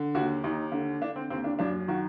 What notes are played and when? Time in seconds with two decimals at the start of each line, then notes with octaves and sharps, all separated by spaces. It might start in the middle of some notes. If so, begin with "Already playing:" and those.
Already playing: D3
0.15 D#2 F#4
0.44 D#2 D#4
0.72 D3
1.01 D3 D4
1.16 C4
1.30 D#2 C4
1.44 D4
1.59 F#2 D4
1.88 D#3 F#4